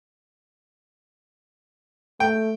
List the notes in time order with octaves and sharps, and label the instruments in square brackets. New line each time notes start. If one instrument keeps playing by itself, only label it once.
[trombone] A3 [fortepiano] G5